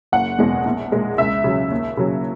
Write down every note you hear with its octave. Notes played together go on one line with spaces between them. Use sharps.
F#1 F#5
E2 B2 G#3
A#1
A#2 G#3
C#2 E5
C#3 F#3
D#2
C#3 F#3